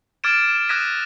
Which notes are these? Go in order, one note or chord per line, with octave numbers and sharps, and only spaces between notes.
D6 F6 G#6 A6 D7 E7
D#6 F#6 G#6 A#6 B6 D#7